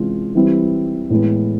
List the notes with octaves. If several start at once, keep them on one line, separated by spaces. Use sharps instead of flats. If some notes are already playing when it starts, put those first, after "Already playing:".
Already playing: C3 E3 G#3 C#4 F4
E3 G3 C4 E4
A2 E3 G#3 B3